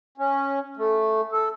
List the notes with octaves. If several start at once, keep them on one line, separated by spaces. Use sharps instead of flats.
C#4
A3
A4